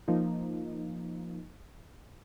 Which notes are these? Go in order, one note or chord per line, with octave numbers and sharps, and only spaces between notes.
F3 A#3 D#4 F4